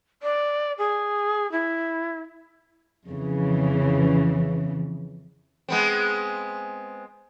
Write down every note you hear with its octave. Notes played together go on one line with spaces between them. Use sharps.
D5
G#4
E4
F2 C#3 E3
G#3 B3 C4